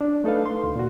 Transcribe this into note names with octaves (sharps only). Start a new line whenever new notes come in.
D4
A3 D#4 A4 B4 F5
C6
D2
A#2 F#4